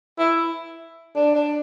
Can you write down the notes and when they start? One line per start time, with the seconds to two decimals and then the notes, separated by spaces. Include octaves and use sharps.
0.19 E4
1.16 D4
1.35 D4